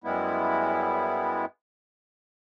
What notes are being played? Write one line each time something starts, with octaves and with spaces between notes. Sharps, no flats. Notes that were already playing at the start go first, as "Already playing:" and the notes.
F#2 G3 G#3 B3 E4